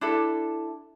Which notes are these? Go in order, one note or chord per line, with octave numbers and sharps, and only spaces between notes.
D4 E4 A4